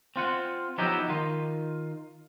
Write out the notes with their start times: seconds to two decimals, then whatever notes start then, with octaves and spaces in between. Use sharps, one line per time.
0.16 C4 F4 F#5
0.78 F3 F#3 B3 D#4 E4 G4
1.09 D#3 D#4 F4